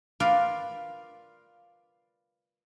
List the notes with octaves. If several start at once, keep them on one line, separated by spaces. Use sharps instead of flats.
F4 A#4 B4 D5 F5